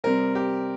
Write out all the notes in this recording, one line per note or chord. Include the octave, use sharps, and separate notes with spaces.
C3 G3 C4 A#4
G4